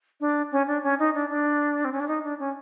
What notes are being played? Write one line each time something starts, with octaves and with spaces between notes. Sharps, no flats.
D4
C#4
D4
C#4
D#4
D4
D4
C4
C#4
D4
D#4
D4
C#4